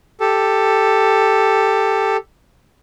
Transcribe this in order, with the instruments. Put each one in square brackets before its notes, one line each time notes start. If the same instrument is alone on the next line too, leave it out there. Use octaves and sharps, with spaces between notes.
[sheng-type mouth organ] G4 A4